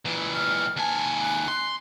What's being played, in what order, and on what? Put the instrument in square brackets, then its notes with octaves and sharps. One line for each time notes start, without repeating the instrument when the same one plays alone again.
[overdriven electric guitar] A#2 E3
[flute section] G5 F6
[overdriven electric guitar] D#2 G#5 [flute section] A5
[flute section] F#6
[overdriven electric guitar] C6